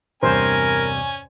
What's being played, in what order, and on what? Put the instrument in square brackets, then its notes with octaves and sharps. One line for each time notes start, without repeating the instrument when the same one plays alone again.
[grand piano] E2 G2 C3 [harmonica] C#4 G#5 [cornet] A#4 [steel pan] C5